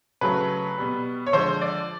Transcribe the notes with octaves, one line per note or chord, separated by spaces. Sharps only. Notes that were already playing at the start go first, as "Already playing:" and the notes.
C#3 F#3 A3 B4
B2 G3
C#5
D3 F3 G#3 C5
D5